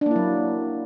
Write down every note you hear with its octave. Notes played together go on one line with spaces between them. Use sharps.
F#3 A#3 D4 E4